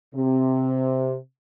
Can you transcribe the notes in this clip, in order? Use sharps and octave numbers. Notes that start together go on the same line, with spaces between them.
C3